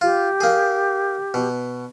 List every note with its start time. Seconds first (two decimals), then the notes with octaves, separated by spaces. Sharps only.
0.01 F4 G4
0.40 A#3 G#4
1.34 B2